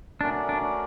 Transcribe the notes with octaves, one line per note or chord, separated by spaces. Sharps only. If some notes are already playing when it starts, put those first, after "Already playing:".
A3 C#4 D4 F#4 A#4 D5
D4